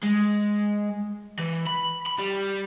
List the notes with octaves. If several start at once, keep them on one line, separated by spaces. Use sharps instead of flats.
G#3
E3
B5
B5
G3